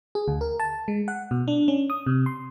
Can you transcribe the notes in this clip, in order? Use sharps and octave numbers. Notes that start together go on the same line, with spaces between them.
G#4
D2
A#4
A5
G#3
F#5
B2
D4
C#4
D#6
C3
C6